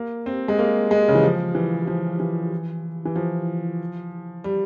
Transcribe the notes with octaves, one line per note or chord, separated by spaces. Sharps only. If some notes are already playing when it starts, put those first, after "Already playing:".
Already playing: A#3
C4
G#3
A#3
G#3
C#3
E3
F3
E3
F3
E3
E3
F3
G3